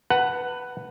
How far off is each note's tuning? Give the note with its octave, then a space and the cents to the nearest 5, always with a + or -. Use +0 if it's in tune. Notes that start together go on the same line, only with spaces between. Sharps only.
B4 +0 F#5 +10 A5 +40